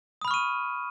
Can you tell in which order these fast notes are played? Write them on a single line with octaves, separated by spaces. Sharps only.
D#6 B5 F6 C#6 D#7